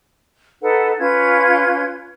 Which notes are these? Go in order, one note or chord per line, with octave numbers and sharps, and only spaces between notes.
D#4 A4 B4 F#5
C#4 F4 B4 G#6